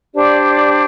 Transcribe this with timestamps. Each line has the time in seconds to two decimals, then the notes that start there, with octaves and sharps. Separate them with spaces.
0.14 D4 G4 C5 D5
0.48 D5